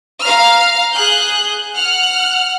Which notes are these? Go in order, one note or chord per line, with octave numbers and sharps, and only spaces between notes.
F5 A#5 F6
G#4 F#6 G6
F#5 F6 F#6